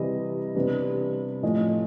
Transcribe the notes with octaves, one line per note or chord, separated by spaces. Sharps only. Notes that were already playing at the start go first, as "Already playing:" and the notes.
Already playing: C3 E3 G3 D#5
C3 E3 G3 B3 D4
A2 F3 A3 C#4 D#5